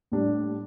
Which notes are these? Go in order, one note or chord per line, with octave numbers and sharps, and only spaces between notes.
A2 G3 D4